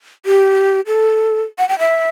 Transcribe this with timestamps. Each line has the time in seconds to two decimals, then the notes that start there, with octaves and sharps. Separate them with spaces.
0.26 G4
0.87 A4
1.59 F#5
1.69 G5
1.79 E5